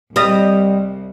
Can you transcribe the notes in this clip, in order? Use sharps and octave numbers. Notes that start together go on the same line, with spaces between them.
C2 G3 D#5